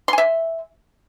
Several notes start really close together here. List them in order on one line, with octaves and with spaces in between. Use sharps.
C6 G#5 E5